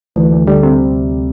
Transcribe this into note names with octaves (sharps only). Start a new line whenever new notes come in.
D2 E3
D2
D3 G3
C3